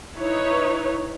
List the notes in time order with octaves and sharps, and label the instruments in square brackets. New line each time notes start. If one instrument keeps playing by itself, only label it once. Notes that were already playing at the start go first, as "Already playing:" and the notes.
[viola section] D#4 E4 B4 C#5